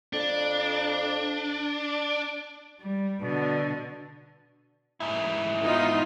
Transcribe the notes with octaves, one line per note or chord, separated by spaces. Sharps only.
F2 D4
G3
B2 D3
G#2 E4
B3 D#4 F4